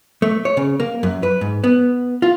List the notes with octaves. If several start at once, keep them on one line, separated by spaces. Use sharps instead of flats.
A3
C#5
C#3
A#3
F#2
B4
G#2
B3
F4